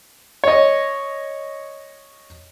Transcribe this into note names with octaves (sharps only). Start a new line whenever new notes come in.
C#5 D#5